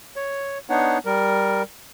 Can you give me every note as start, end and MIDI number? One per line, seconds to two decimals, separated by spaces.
0.16 0.58 73
0.70 0.98 59
0.70 0.98 62
0.70 0.98 63
0.70 0.98 73
0.70 0.98 78
1.05 1.63 55
1.05 1.63 70